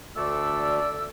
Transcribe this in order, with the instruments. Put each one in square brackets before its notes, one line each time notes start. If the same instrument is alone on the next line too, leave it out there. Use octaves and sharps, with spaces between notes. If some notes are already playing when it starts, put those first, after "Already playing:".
[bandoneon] D2 A3 [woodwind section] D4 A4 D5 [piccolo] E6